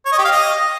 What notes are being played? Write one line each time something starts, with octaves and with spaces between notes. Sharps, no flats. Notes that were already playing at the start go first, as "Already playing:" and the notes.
C#5
D#5
G4
F5
D#5